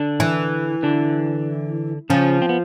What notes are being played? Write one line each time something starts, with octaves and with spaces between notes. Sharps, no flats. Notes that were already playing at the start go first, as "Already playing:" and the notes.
Already playing: D3 D4
E3
D3 D4
C#3 F3 C#4
C4
B3